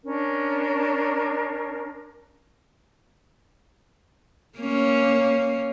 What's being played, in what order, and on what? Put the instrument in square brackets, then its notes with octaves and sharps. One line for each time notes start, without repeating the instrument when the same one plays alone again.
[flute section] C#4 D4 A#4
[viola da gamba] A#3 C#4